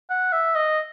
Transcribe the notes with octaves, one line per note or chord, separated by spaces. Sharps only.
F#5
E5
D#5